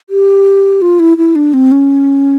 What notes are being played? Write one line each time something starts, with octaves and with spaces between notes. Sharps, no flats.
G4
F4
E4
E4
D4
C4
C#4